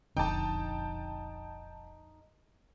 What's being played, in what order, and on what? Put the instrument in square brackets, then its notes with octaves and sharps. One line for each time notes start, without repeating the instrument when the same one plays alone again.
[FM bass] E1 [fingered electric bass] A#1 F2 D3 [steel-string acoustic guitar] D#4 [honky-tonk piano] G5 A5